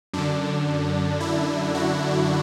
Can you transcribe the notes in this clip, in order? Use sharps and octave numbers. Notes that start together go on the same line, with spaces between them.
F#2 D3 D4
E4
F#4